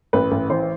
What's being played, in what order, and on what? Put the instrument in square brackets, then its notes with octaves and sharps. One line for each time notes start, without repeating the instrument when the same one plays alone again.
[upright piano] A1 B4
A1
E3 C5